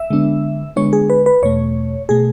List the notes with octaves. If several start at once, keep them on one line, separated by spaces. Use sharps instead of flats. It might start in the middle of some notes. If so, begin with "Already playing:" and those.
Already playing: E5
D3 G#3 B3 D4
D3 G#3 B3 D4 C#5
G#4
B4
B4
E2 B2 A3 C#5
B2 A3 G#4